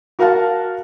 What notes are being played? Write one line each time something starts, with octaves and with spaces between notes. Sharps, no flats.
F#4 A#4 F5 F#5 A5